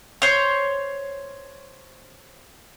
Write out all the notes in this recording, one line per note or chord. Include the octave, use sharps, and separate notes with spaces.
C5 C#5